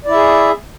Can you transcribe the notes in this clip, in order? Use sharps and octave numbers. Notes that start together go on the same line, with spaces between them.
E4 G#4 D5 E5